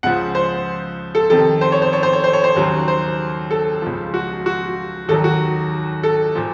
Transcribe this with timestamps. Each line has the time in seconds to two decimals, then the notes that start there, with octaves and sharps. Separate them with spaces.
0.03 C#2 C#3 F3 F#5
0.35 C5
1.15 A4
1.30 F2 C3 D#3 A4
1.61 C5
1.72 C#5
1.82 C5
1.93 C#5
2.03 C5
2.13 C#5
2.24 C5
2.33 C#5
2.44 C5
2.56 D#2 C#3 F#3
2.88 C5
3.51 A4
3.82 C#2 C#3 F3
4.14 F#4
4.46 F#4
5.08 D#2 D#3 F#3 A4
5.24 F#4
6.03 A4
6.35 A#2 F3